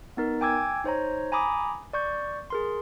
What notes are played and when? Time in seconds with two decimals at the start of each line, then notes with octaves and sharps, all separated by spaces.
0.17 B3 D#4 A#4
0.41 G5 G#5 D6 E6 G#6
0.84 D#4 C5 C#5 A#5
1.32 G#5 A#5 B5 D6 D#6
1.93 D5 C#6 G6
2.50 G#4 A#4 C6